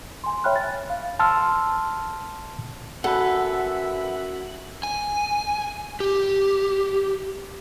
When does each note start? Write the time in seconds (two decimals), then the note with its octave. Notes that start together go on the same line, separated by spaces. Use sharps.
0.24 G#5 C6
0.44 C#5 E5 G5 B5 F6 F#6
0.56 A6
0.90 F5
1.19 A5 C6 E6 F6
3.04 F#2 A4 B4 E5 F#5
4.83 G#5
6.00 G4